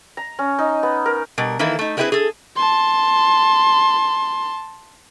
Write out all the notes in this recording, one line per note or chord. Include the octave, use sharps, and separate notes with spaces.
A#5
C#4
D#4
B3
A#4
B2 G3 A#4
D#3 E3 A#3 E4 A4
A3 D#4
G#3 A#3 C4 E4 G#4 B4
G#4 A4
A5 C6